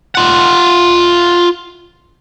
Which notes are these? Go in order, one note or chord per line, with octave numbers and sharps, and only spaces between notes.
F4 F#5